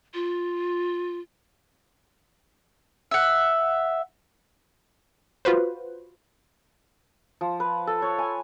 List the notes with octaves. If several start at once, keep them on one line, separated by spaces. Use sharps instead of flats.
F4
E5 F#5
F4 F#4 B4 C5
F3
B4
A4
C#5
G#5